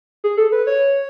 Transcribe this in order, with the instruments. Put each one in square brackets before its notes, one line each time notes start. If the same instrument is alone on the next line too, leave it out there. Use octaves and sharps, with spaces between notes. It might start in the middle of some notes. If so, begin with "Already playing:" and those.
[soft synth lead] G#4
A4
B4
C#5